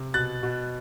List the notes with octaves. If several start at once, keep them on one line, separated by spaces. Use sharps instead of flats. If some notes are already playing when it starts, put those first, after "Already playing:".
Already playing: C3
B2 F#6 A6
B2